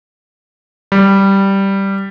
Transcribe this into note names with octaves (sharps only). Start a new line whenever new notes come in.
G3